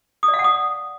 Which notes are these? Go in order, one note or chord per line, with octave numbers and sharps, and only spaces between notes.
D#6
D5
F5
F#5
D#6